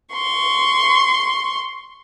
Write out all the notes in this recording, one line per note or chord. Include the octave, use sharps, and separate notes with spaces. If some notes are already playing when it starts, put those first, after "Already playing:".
C6 C#6